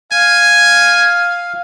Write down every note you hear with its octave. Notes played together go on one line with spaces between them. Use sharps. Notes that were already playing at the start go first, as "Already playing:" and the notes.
F5 G#5